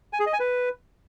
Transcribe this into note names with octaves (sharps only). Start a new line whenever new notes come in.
G#5
G#4
D#5
G#5
B4